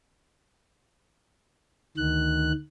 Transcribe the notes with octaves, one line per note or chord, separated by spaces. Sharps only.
D2 D#3 F#6